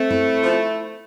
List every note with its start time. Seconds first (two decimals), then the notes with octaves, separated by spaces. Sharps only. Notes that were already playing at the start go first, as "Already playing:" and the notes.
Already playing: A3 C4
0.11 E4
0.42 F3